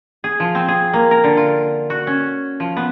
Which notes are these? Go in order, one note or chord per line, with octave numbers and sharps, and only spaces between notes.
G#4
F3
C4
G#4
A#3
A#4
D3
F4
F#4
C#4
F3
B3